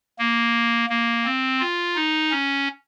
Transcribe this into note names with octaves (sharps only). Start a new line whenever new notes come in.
A#3
A#3
C4
F4
D#4
C#4